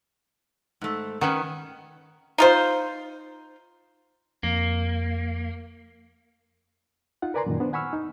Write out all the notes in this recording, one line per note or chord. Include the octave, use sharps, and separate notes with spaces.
G#2 A3
D#3 C#4 B4 F#5
D#4 F4 C5
F2 A#3
D#4 F4 F#5
A#4 B4 D5 G#5 A#5 C6
F#2 A#2 D#3
B3 D4 C5
F#5 G#5 B5 C#6 E6 F6
D#4